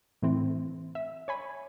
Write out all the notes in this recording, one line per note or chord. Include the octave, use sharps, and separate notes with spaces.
A2 E3 C4
E5
C#5 G#5 B5